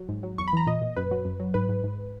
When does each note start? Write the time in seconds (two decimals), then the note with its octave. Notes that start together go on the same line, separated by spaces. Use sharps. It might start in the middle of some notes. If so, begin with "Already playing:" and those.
Already playing: F#3
0.09 G#2
0.23 F#3
0.38 E2 C#6
0.48 B5
0.53 E3 A#5
0.67 A#2 D#5
0.82 A#2
0.96 F#2 B4
1.11 F#3
1.25 F#2
1.40 F#3
1.54 G#2 B4
1.69 G#2
1.84 G#2